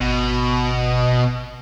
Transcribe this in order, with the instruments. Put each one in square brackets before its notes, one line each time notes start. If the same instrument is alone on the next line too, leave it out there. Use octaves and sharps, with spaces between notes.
[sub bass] G#1 [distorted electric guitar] B2